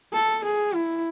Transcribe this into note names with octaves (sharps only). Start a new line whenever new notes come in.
A4
G#4
E4